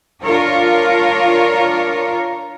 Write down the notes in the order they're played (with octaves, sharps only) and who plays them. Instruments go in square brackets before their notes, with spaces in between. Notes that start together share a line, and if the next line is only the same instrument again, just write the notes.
[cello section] D4 F4 A#4 C#5